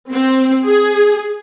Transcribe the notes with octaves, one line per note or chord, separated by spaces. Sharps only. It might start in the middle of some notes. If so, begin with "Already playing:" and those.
C4
G#4